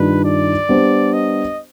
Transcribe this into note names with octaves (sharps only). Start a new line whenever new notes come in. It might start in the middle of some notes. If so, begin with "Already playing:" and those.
Already playing: G2 D#3 G3 D4 F4 B4
D5
G3 B3 D4 G4 C5
D#5